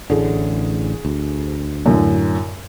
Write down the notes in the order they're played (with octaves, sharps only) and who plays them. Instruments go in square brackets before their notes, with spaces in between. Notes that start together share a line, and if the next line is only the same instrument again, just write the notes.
[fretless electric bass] A1 A2 D3 [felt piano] G#4
[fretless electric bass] D2
[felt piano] F#2 A2 D3